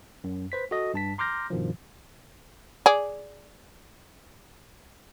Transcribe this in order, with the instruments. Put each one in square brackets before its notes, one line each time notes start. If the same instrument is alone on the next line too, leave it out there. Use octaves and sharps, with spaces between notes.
[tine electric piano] F#2
B4 C5 B6
F#4 A4 D#5
G2 A5 B6
A#5 C6 D6 F6 G6 A#6
G2 B2 D#3 F3
[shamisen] G#4 D5